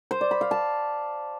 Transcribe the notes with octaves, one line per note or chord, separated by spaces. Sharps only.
C5
D5
B5
F5
A5